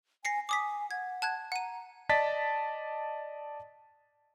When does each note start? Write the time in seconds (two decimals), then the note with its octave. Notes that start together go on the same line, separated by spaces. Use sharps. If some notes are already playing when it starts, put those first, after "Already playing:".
0.25 G#5 A#6 C7 C#7
0.49 G#5 D6 D#6 B6
0.91 F#5 G#6
1.22 A5 F#6 G#6
1.52 F#5 A#5 D#7
2.09 D5 D#5 A5 A6 B6